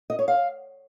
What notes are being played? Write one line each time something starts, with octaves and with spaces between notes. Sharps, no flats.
D#5
C#5
F5